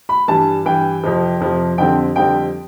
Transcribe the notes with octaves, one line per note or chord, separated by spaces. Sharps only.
B5
G2 E3 G3 A5
G2 E3 G3 G5
F2 C3 F3
F2 C3 F3
F2 D3 G3 C4 G5
F2 D3 G3 C4 G5